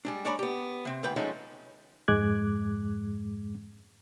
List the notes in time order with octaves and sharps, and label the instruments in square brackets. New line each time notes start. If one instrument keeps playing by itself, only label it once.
[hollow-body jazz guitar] G3 G#3 D4
G#3 D4 C#5 D5 A#5 B5
B3 G4
C3 C4
D2 G#2 B4 G5
F3 F#3 G#3 A3 C#4 D#4
[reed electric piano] F2 G#2 G#3 D6 F#6 G#6